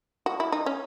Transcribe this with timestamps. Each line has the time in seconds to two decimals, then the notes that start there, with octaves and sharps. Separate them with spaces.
0.26 F#4
0.40 E4
0.52 D#4
0.66 C#4